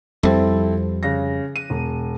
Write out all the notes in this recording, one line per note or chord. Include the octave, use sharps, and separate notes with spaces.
F2 G3 C4 E4 A4
C#3 A#6
D#7
E1